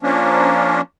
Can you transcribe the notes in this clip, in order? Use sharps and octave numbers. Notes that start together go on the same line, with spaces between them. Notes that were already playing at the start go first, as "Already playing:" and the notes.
F3 A#3 C#4 D4